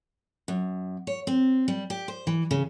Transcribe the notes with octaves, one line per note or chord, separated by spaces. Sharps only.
F#2
C#5
C4
G3
G4
C5
E3
C#3